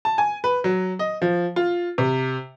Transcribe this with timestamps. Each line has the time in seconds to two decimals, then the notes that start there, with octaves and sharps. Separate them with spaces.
0.05 A5
0.18 G#5
0.44 B4
0.64 F#3
0.99 D#5
1.22 F3
1.56 F4
1.98 C3